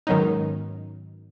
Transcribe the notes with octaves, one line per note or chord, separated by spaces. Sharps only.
G#2 D#3 F#3 B3 C#4 D#4